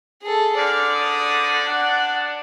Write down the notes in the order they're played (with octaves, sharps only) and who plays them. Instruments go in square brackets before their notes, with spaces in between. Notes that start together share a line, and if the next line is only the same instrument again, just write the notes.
[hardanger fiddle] G#4 A4
[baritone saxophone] D3 [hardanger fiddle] D5 [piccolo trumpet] F6
[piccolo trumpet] D#6
[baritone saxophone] D4 [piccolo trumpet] F#5